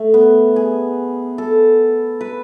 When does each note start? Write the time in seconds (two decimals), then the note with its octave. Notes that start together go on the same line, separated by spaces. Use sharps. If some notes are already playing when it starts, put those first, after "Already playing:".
Already playing: A3
0.14 B3
0.56 G#4
1.38 A4
2.21 B4